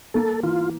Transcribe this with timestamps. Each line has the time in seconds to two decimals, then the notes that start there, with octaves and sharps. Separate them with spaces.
0.14 A#3 A4
0.43 E3 F4